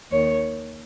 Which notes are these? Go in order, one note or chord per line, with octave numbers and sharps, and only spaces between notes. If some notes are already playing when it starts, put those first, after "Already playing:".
D#2 D#3 C#5